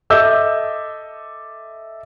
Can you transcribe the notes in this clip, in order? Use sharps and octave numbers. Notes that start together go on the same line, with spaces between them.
A4 D#5 E5 D6 E6 G6